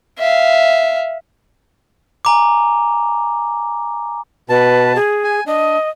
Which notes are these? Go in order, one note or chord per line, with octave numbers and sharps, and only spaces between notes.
E5 F5
G#5 A#5 D6
B2 B4 A5
G#4
G#5
D4 D#5